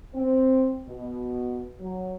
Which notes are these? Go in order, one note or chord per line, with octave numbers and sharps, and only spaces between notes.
C4
B2
F#3